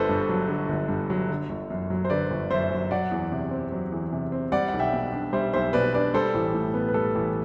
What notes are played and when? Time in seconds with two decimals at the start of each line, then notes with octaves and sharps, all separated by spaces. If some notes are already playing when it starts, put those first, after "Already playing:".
Already playing: G1 D3 A4 B4 C5
0.09 G2
0.29 F#3
0.49 D3
0.68 G1
0.89 G2
1.10 F#3
1.30 D3
1.49 G1
1.70 F#2
1.90 F#3
2.05 C5
2.10 D3 B4 D5
2.31 G1
2.50 F#2 C5 E5
2.71 F#3
2.91 F#3 D5 F#5
3.11 E2
3.32 C3
3.51 C4
3.72 F#3
3.92 E2
4.13 C3
4.32 C4
4.52 G3 D5 F#5
4.68 F#5
4.73 B1
4.79 E5 G5
4.93 B2
5.13 D4
5.33 G3 C5 E5
5.53 B1 C5 E5
5.73 B2 B4 D5
5.93 D4 B4 D5
6.14 G3 A4 C5
6.34 A1
6.54 A2
6.74 B3
6.88 B4
6.94 G3 A4
7.15 A1